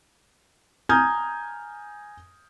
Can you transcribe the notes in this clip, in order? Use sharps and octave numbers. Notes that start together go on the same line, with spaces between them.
G#5 A#5 D#6 F6 G6 G#6